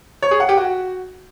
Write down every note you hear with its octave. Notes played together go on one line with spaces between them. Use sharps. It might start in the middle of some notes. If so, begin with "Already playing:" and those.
C#5
G#4
F#5
G4
F#4